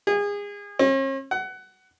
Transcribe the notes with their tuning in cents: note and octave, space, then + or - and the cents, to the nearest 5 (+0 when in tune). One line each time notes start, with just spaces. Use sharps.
G#4 -30
C#4 -45
F#5 +20